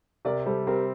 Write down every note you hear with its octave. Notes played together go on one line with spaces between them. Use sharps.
C3 A#4 D5
G3 A4 C5
C4 G4 A#4